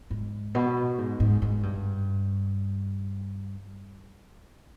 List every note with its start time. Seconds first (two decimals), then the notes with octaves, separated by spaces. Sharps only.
0.10 G#2
0.55 B2
0.98 G#2
1.20 G#2
1.42 G#2
1.63 G2